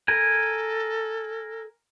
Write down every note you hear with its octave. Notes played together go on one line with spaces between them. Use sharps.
A4 A#4 G#5